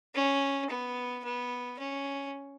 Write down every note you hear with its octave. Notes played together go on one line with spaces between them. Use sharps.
C#4
B3
B3
C#4